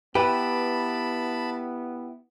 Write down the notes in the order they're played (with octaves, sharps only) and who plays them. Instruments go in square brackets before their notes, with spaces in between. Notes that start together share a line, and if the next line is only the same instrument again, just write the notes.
[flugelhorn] B3 [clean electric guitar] E4 G4 [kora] B4 [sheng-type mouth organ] A5 B5